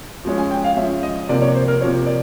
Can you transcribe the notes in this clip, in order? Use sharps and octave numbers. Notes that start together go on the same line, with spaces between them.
F3 G#3 C#4
G#5
G5
F5
F3 G#3 C#4 E5
D#5
C3 F3 A#3 D5
C#5
C5
A#4
C3 F3 A#3 C#5
D5